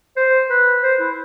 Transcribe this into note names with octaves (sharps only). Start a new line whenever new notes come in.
C5
B4
C5
E4